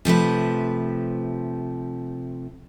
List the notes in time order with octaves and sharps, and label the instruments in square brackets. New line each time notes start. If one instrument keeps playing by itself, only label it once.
[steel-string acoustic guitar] C3 F3 A3 B4